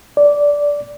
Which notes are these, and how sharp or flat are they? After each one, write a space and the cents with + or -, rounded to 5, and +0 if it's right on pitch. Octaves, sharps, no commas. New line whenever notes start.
D5 -10